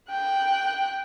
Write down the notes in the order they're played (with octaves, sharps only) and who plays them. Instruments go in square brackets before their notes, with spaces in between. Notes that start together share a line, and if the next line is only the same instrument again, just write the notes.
[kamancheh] G5 F#6